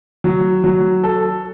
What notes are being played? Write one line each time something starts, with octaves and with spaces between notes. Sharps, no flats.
F#3
F#3
A4